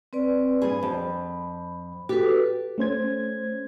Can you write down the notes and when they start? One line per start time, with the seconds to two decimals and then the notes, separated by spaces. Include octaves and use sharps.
0.13 C4 B4 D5
0.62 G2 G#4 B5
0.83 F2
2.09 F#4 G4 A4 B4
2.78 A3 C#4 C5 G#6